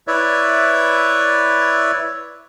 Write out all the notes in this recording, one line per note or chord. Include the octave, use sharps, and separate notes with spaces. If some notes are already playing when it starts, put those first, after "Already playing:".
E4 B4 C#5 D5 E5